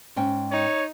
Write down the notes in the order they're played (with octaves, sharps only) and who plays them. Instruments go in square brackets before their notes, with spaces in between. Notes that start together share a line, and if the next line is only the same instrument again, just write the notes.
[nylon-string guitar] G#2 C#4 G5
[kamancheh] D#4 [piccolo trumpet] C#5